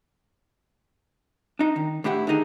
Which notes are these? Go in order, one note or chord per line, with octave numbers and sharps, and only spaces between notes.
D4 D#4
D#3
A2 D4 E4 G4 F#5
D3 D#3 D#4 G#4